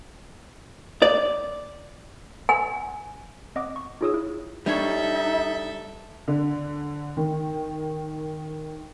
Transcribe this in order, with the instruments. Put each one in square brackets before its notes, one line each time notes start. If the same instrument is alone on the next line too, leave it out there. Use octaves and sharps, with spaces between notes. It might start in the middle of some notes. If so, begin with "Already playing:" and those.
[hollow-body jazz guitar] D5
[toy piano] G#5
[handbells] C4 D#5 F#5 D6
C#6
D#4 F4 G#4 C#5 D#6 E6
E4
[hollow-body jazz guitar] G3 D4 C#5 [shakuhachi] D#4 [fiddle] A4 E5
[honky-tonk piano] D3
D#3